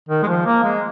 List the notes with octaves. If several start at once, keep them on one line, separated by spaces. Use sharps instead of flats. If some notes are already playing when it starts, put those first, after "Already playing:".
D#3
G#3
F3
A#3
G#3